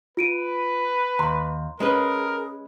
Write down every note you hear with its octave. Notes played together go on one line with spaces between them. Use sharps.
F4 B4 D7 D#7
D#2 A#5 C6
G#3 C#4 G#4 A#4 B4